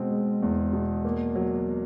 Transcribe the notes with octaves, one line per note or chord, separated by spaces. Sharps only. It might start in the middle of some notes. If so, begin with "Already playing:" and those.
Already playing: B2 G#3 C4
G#3
E2
B2
A#3
F#3